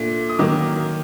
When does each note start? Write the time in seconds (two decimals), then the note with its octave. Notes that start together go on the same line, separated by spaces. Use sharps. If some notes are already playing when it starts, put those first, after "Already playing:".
Already playing: A#2 A3 D4
0.29 D#6
0.39 D#3 F#3 A#3 D6